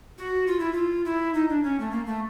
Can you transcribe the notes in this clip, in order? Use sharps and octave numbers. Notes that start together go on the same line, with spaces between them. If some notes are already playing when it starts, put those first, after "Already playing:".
F#4
F4
E4
F4
E4
D#4
D4
C#4
A3
A#3
A3